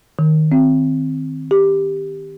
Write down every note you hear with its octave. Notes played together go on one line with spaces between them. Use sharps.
D#3
C4
G4